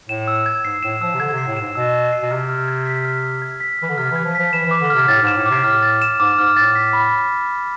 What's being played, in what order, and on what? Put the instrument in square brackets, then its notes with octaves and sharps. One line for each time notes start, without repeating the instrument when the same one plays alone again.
[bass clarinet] A2 [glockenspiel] E7
[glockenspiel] E6
G#6
[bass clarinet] G#2 [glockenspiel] C7
[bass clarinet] A2 [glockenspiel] E7
[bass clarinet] F3 [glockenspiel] E6
[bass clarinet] C3
[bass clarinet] D3 [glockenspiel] G#6
[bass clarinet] C3 [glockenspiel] C7
[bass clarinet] A2
[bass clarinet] G#2 [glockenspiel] E7
[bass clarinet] B2 [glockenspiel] E6
[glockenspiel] G#6
C7
[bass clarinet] B2
[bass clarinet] C3 [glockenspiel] F6
[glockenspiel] F6
G#6
B6
F6
F6
G#6
B6
[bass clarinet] E3 [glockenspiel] F6
[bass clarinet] D3
[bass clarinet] C3 [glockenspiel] F6
[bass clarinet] E3 [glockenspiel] G#6
[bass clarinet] F3
[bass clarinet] F3 [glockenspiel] B6
[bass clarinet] E3 [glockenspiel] E7
[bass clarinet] E3 [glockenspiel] D6
[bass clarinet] D3
[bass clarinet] C3 [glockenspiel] F6
[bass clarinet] A2 [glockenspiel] A6
[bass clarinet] G#2 [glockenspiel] E7
[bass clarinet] A2
[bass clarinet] C3 [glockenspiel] D6
[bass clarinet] A2 [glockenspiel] F6
[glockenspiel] A6
E7
[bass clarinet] G#2 [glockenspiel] D6
[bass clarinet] G#2 [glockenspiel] F6
[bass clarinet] A2 [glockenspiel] A6
[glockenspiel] B6
B5